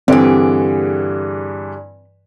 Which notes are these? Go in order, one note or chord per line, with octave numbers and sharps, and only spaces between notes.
G2 D3 E3 C4 G4 G#4